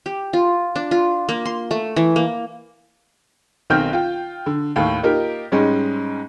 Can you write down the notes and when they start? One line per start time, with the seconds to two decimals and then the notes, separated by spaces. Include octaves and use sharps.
0.06 G4
0.33 F4
0.76 D4
0.91 F4
1.29 A#3
1.45 C6
1.71 A3
1.96 E3
2.16 A#3
3.70 B1 D#3 C4 G5 F6 G6
3.93 F4 G5
4.46 D3
4.76 D#2 A2 F5 G5
5.03 A#3 D#4 F4 G4 A#4
5.52 G#2 G3 G#3 C#4 D#4